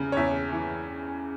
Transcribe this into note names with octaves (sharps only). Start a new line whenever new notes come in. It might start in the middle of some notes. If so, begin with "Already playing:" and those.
Already playing: E2 C#3
C#5
E2 E5
E3